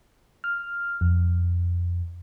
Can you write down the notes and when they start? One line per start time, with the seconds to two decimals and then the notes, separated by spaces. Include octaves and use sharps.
0.44 F6
1.01 F2